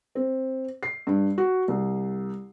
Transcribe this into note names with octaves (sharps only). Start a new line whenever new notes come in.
C4
C7
G2
F#4
C2